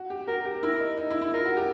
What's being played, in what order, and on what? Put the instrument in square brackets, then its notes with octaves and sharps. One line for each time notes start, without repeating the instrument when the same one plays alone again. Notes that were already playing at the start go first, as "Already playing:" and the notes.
Already playing: [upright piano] F#4
G4
[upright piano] F#4 [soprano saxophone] A#4
[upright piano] G4
[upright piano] E4 [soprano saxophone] A#4
[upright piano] D#4
D#4
E4
E4
[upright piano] F4 [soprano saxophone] A#4
[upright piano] F#4
G4